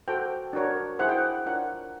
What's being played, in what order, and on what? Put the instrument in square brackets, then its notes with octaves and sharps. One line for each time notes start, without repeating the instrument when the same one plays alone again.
[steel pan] F#4 A4 C5 G5
D4 F#4 A#4 C#5
E4 G#4 C5 F#5
G5
F#5
D4 F4 A#4 C#5 F#5